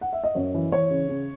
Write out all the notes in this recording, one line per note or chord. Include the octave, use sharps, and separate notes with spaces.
F#5
E5
D#5
F#2 C#5
E3
E3 C#5
C#3
C#3